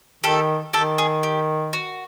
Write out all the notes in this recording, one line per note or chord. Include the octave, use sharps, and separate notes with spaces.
D#3 G4 A4
D#3 G4 A4
G#4
G4
F#4